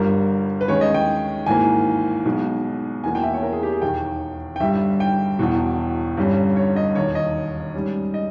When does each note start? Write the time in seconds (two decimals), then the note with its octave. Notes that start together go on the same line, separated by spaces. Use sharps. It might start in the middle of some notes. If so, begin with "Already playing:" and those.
Already playing: G1 G2 G3 A#4
0.61 B4
0.68 D#2 D#3 G#3 C#4 C#5
0.81 D#5
0.94 G5
1.46 G#1 G#2 E3 A#3 G#5
2.25 B1 B2 G#3
3.04 E1 E2 B2 A#3 G#5
3.15 G5
3.23 E5
3.34 C#5
3.43 A#4
3.53 G#4
3.63 G4
3.72 G#4
3.81 E1 D#2 D#3 G5
4.56 G5
4.60 G1 G2 G3 E5
5.00 G5
5.39 E1 E2 B2
6.17 G1 G2 G3 C#4
6.56 C#5
6.76 D#5
6.95 E1 D#2 D#3 C#5
7.15 D#5
7.74 G#2 G3 C#4
8.14 D#5